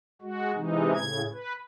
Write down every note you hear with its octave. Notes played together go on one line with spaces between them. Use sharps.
G#3 F#4
C3 E3 G#3 D#4
A2 C#3 G#6
B4